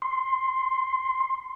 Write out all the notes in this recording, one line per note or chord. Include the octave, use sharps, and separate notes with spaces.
C6